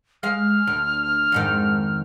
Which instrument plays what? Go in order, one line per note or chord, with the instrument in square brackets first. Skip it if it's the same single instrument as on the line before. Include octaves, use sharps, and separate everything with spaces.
[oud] G#3 F5 [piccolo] F6
[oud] D2
F2 G#2 D#3